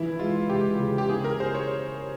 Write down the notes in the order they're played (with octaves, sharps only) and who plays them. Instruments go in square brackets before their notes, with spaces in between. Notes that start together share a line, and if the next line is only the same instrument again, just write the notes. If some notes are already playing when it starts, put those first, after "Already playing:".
Already playing: [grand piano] E3 [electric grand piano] E4
[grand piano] G#3 [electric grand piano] F4
[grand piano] C#3 [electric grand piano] G4
[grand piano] C#3
[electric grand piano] G4
[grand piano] E4 [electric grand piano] G#4
[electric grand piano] A#4
[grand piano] G#4 [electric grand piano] C5
[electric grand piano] C#5